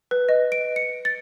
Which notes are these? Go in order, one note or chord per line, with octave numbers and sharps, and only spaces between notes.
B4
D#5
D7
C#7
A6